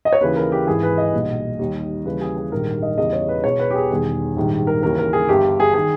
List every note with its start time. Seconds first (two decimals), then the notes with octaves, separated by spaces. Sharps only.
0.05 D#5
0.13 C#5
0.21 D#2 C#3 E3 B4
0.36 A#4
0.52 G4
0.67 G#1 G#2 E3 G#4
0.83 B4
0.98 D#5
1.13 B1 A#2 G3
1.59 D#2 D#3 G3
2.05 D#2 C#3 E3 G3 B4
2.21 G#4
2.37 G#4
2.51 A#1 G#2 D#3 G3 A#4
2.82 D#5
2.97 E2 C#3 E3 G3 D#5
3.13 C#5
3.28 B4
3.44 E1 E2 B2 C#5
3.59 B4
3.71 G4
3.75 G#4
3.90 E1 E2 D#3 G3
4.36 A#1 G#2 D#3 G3
4.67 A#4
4.83 D#2 C#3 E3 A#4
4.98 A#4
5.13 G#4
5.29 G1 G2 G3 G4
5.60 G#4
5.74 D#3 G#4